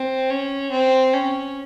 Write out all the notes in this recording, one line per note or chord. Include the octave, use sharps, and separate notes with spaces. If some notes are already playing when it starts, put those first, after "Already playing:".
Already playing: C4
C#4
C4
C#4